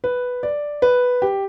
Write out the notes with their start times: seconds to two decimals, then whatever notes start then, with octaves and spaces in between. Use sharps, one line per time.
0.04 B4
0.43 D5
0.82 B4
1.22 G4